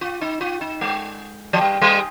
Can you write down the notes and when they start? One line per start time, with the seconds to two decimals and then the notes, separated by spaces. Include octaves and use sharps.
0.01 F4
0.21 D#4
0.41 F4
0.61 D#4
0.81 G#3
1.53 F3
1.61 G3
1.82 G3